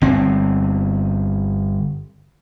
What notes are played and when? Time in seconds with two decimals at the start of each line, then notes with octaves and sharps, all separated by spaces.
0.02 G1 C4